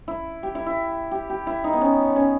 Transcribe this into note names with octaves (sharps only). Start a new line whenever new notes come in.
E4
G4
E4
E4
G4
G4
E4
D#4
B3
C#4
C#4